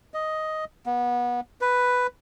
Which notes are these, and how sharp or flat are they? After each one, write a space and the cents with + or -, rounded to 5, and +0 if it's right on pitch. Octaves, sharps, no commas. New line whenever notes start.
D#5 +5
B3 -25
B4 +5